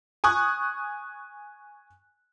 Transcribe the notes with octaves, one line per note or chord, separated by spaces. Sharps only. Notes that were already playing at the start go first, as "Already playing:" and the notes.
G#5 C#6 D#6 F#6